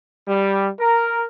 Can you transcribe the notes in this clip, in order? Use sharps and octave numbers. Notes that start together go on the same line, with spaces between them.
G3
A#4